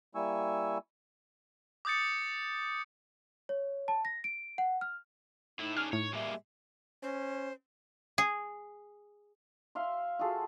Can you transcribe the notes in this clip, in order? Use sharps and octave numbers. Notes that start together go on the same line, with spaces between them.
G3 A#3 E4 G#5 C#6 E6
D6 D#6 G6 A6 C#7
C#5
A5
A#6
D7
F#5
F6
A2 D#4 E4
C#4 D4 G#4 F6
A2 C#5
G3 G#3 A#3 E5
C#4 C5
G#4
E5 F5 C6
F4 F#4 G#4 A4